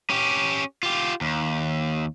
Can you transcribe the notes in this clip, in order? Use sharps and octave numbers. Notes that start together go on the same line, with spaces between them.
C#4 G4
F4 G4
D#2